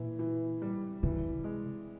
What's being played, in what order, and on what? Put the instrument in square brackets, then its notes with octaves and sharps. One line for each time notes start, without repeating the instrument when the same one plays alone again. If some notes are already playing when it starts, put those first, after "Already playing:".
Already playing: [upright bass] A#2 [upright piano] E3
[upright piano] E3
G3
[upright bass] C3 [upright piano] E3
[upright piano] G#3